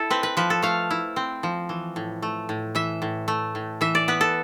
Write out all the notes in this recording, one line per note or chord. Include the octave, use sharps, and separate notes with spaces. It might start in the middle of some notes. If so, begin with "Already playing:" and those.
Already playing: E4 A4
C4 B4
B4
F3 B4
A4
A3 F5
E4
C4
F3
E3
A2
A3
A2
E3 E5
A2
A3
A2
E3 E5
D5
B3 B4
A4